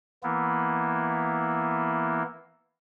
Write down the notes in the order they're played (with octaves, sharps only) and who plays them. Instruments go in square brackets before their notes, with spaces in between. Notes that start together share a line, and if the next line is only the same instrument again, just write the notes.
[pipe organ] E3 A#3 B3 E4